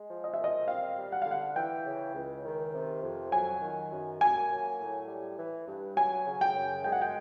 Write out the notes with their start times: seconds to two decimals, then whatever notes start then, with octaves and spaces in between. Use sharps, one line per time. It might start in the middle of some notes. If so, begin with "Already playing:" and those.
Already playing: G#3
0.10 F3
0.24 D#5
0.34 E5
0.38 A#2
0.44 D#5
0.68 C4 F5
0.98 G3
1.12 F#5
1.22 F5
1.27 D3 F#5
1.56 E3 G5
1.86 C#3
2.15 C#2
2.45 D#3
2.74 C3
3.03 F2
3.32 F#3 G#5
3.61 D#3
3.91 F#2
4.21 A#3 G#5
4.50 F#3
4.80 A2
5.08 G3
5.38 E3
5.68 G2
5.97 F#3 G#5
6.27 C#3
6.41 G5
6.56 F#2
6.84 G#3 G5
6.92 F#5
7.02 G5